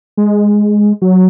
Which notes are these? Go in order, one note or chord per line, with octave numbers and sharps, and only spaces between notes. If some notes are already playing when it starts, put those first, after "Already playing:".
G#3
F#3